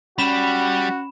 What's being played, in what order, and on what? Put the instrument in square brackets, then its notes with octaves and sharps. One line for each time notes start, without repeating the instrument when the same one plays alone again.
[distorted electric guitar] G3 [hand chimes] C#4 [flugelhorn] F#4 [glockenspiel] B5 E7